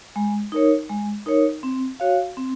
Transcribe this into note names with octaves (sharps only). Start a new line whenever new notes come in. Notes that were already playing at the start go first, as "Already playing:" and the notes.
G#3
D#4 A#4 C#5
G#3
D#4 A#4 C#5
C4
F#4 C#5 F5
C4